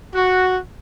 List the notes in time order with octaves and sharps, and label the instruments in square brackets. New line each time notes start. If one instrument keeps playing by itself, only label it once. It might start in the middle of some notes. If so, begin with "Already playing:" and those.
[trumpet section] F#4